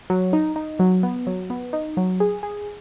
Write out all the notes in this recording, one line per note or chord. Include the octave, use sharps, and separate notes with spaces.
F#3
D#4
D#4
F#3
B3
F#3
B3
D#4
F#3
G#4
G#4